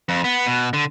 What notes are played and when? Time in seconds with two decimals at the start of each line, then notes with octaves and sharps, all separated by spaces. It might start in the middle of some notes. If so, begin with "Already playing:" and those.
0.09 F2
0.24 B3
0.46 B2
0.73 D3